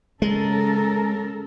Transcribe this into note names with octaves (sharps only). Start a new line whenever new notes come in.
C#3 G#3 A4 A#4